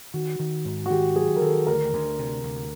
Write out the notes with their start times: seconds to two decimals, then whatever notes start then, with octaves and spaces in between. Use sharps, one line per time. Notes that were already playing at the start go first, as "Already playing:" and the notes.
0.14 D#3 F#4
0.40 D#3
0.65 G#2
0.86 F#4
0.90 D#3 G4
1.15 F#3 G#4
1.36 A#4
1.41 D#3 A4
1.67 D2 A#4
1.93 D2
2.19 C3
2.43 D2